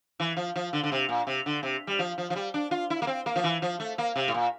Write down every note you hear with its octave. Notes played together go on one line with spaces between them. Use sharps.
E3
F3
F3
D3
D3
C3
A#2
C3
D3
C3
G3
F3
F3
F3
G3
D4
F4
E4
A#3
C4
A#3
F3
E3
F3
A3
A#3
C3
A2
A#2